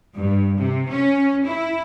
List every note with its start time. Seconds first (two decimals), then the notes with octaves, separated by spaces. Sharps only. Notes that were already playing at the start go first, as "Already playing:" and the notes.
0.16 G2
0.58 C3
0.91 C#4
1.46 E4